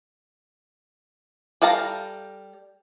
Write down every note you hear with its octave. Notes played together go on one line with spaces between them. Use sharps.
G3 A4 F5 A5 A#5